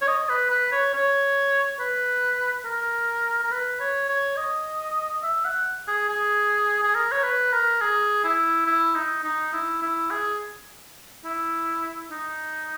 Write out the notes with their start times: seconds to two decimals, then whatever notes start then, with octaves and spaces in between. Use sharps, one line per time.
0.01 C#5
0.08 D#5
0.29 B4
0.50 B4
0.72 C#5
0.94 C#5
1.79 B4
2.65 A#4
3.43 A#4
3.51 B4
3.80 C#5
4.09 C#5
4.37 D#5
5.23 E5
5.45 F#5
5.88 G#4
6.09 G#4
6.83 G#4
6.95 A#4
7.12 C#5
7.24 B4
7.52 A#4
7.81 G#4
8.24 E4
8.66 E4
8.95 D#4
9.24 D#4
9.53 E4
9.82 E4
10.11 G#4
11.25 E4
12.11 D#4